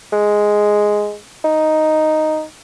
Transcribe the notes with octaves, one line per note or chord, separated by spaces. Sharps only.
G#3
D#4